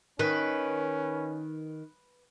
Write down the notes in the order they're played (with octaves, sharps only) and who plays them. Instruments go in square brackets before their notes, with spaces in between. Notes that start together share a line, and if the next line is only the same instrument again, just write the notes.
[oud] D#3 [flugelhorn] C#4 [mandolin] B4 B5